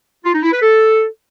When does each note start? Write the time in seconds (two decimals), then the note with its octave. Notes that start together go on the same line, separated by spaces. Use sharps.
0.24 F4
0.33 D#4
0.43 E4
0.52 B4
0.62 A4